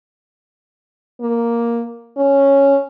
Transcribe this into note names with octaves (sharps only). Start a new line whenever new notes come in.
A#3
C#4